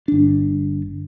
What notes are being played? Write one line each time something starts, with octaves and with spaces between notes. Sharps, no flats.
G1 D4